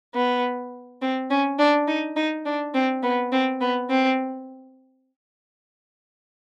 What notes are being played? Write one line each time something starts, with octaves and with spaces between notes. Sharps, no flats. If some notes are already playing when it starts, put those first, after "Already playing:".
B3
C4
C#4
D4
D#4
D#4
D4
C4
B3
C4
B3
C4